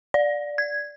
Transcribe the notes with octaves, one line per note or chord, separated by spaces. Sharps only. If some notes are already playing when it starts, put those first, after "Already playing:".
D5
G#6